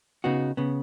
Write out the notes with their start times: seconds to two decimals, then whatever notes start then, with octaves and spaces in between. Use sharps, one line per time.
0.24 C#3 B3 D#4 F#4
0.57 C#3 B3